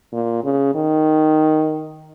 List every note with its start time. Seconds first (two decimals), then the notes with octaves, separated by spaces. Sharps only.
0.13 A#2
0.44 C#3
0.75 D#3